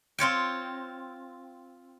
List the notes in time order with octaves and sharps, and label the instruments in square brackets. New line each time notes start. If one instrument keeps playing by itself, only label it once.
[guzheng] C4 F4 C#5 G5